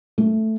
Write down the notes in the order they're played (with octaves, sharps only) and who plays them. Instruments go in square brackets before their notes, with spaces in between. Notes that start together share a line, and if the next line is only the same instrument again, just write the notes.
[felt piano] A3